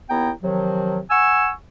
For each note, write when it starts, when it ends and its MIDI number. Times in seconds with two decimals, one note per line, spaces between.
0.09 0.31 39
0.09 0.31 59
0.09 0.31 64
0.09 0.31 79
0.09 0.31 82
0.43 1.00 48
0.43 1.00 51
0.43 1.00 53
0.43 1.00 54
1.10 1.50 78
1.10 1.50 80
1.10 1.50 85
1.10 1.50 88